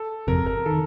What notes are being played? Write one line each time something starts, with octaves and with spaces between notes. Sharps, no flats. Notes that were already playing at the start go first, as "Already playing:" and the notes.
Already playing: A4
G1 F2 C3 A#4
A#4
D#3 A4